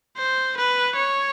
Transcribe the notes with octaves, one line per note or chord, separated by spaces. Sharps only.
C5
B4
C#5